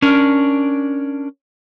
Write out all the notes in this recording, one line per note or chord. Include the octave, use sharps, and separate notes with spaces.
C#4 D4 A#4